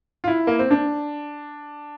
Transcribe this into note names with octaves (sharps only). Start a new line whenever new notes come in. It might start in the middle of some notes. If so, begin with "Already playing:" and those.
F4
E4
A#3
C4
D4